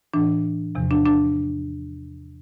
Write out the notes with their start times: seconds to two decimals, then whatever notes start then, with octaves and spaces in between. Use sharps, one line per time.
0.14 A2 E3 D4
0.75 E2 C3 F3
0.91 D4
1.06 D4